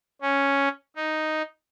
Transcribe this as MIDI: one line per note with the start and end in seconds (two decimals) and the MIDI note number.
0.22 0.68 61
0.96 1.42 63